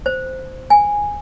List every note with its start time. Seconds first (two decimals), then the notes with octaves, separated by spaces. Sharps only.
0.06 C5
0.70 G#5